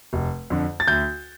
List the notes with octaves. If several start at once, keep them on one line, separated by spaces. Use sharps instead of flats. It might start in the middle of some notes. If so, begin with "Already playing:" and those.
F1
F2 D3
A6
D2 G6